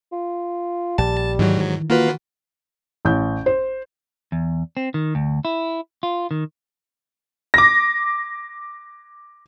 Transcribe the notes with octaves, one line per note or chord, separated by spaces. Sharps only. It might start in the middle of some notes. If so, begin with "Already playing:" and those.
F4
A#1 G3 A5
G#2 D#3 E3 F#3
A#3 F4 F#4 B4
A1 G6
C5
E2
C4
D#3
D2
E4
F4
D#3
D6 A#6